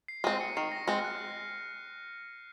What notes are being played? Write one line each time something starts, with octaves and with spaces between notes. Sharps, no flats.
C7
G#3 C4 D#7
C#7
D#3 C7
A#6
G#3 C4 A#6
F6
F#6